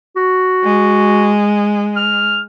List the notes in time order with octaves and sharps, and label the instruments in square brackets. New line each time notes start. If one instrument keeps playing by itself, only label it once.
[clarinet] F#4
[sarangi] G#3
[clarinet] F6